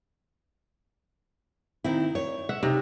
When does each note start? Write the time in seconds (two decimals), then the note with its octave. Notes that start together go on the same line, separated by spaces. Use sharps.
1.84 D#3 C4 E4
2.15 C#5
2.49 E5 F#5
2.63 C3 D#4